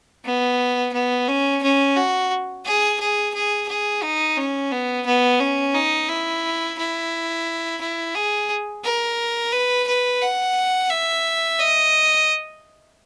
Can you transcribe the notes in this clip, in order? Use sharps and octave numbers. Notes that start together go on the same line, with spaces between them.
B3
B3
C#4
C#4
F#4
G#4
G#4
G#4
G#4
D#4
C#4
B3
B3
C#4
D#4
E4
E4
E4
G#4
A#4
B4
B4
F#5
E5
D#5